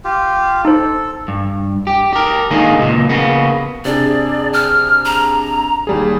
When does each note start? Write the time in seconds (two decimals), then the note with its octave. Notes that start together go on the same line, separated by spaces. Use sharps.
0.04 F4 G4
0.65 D#4 A4 C5
1.28 G2
1.87 G4
2.13 G4 A#4
2.51 D3 D#3 G#3 A#3 D#4
2.78 C#2 A#2
3.09 C#3 A#3 B3
3.85 C3 D4 G#4 D5
4.53 F6
5.05 A#5
5.87 D#2 G3 G#4